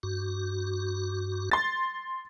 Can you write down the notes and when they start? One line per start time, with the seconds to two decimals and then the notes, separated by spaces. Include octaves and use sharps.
0.03 G2 F#4
1.52 C6 A6